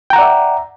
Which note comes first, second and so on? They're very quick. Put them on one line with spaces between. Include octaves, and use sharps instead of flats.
G5 A#5 F#5 D5 E5